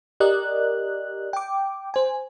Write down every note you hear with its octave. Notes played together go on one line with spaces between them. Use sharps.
G4 A#4 D5 D#5 F#6
G5 D6
C5 G#5